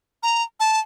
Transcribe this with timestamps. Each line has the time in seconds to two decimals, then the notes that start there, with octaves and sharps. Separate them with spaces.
0.23 A#5
0.60 A5